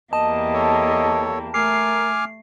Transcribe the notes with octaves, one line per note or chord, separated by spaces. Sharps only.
E2 G3 A#3 D#5 A5
A4 C#5
A3 A#4 G#5 D6 F6 C7